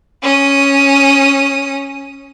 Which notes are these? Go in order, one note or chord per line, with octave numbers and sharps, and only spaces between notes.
C#4 D#6